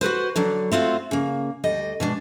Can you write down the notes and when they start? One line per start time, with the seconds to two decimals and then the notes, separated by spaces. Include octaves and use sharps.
0.01 F#4 A4 B4 C5
0.36 D3 F#3 D4
0.72 A3 C4 F4 F#4
1.11 C#3 A#3
1.64 D2 G3 D#5
2.00 B2 G#3 D4